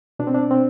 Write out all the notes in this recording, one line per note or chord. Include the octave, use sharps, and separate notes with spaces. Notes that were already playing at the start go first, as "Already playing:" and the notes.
B2 D4
C4
D4
C4